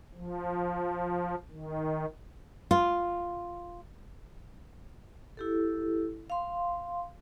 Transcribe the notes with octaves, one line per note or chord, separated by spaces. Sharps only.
F3
D#3
F4
E4 G4 A4
F5 C6